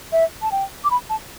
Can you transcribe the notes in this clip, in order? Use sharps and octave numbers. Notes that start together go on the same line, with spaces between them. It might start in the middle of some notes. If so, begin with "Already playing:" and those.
E5
A5
G5
D6
B5
A5